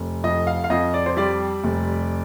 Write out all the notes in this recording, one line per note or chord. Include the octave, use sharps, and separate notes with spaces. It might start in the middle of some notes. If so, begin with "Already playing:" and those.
Already playing: F1
F2 D#5
F5
F5
F2 D#5
D5
C5
G3 D5
F1